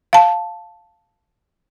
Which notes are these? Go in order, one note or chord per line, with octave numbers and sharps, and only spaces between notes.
F5 A5